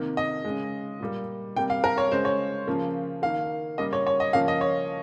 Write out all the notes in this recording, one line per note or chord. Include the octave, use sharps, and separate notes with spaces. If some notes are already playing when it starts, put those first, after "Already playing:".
Already playing: C3 D#3 A#3
D#5
C#3 G#3
A#2 G3 A#3
C3 G3 A#3 G5
F5
A#4
C#5
C#3 G#3 C5
C#5
C#3 F3 A#3
D#3 A#3 F5
C#3 G3 A#3 D#5
C#5
C#5
D#5
C#3 F3 A#3 F5
D#5
C#5